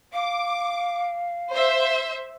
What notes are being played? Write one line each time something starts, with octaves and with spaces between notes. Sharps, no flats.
F5 D6
C5 E5